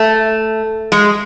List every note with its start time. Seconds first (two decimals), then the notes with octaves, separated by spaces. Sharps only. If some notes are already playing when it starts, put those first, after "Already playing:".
Already playing: A3
0.92 G#3